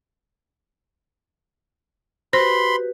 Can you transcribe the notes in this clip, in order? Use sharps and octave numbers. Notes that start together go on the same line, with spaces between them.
F#4 G4 B4 C5 B5 C6